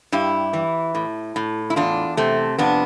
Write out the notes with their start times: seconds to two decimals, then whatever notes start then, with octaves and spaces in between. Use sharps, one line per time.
0.12 G2 E4 G4
0.53 E3
0.95 A2
1.36 A2
1.70 E4
1.76 E2 D4 F4
2.17 C3 A3 C4
2.58 F2 B3 D4